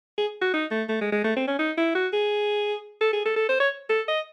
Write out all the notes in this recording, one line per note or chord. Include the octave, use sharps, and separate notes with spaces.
G#4
F#4
D#4
A3
A3
G#3
G#3
A3
C4
C#4
D#4
E4
F#4
G#4
A4
G#4
A4
A4
C5
C#5
A4
D#5